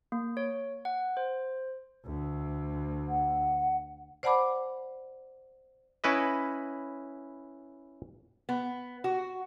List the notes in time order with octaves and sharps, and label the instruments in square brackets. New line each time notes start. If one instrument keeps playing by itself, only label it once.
[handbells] A#3
C#5
F#5
C5
[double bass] D2
[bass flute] F#5
[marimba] C5 D5 F#5 A5 B5 D6
[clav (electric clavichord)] C#4 E4 B4 D#5
[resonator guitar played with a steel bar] B3
F#4